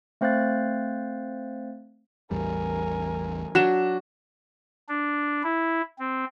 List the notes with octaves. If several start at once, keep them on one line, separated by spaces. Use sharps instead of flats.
A3 C4 C5 F5 F#6 A6
A1 E2 G3 A#4 G#5
F#3 D4 F#4 E7
D4
E4
C4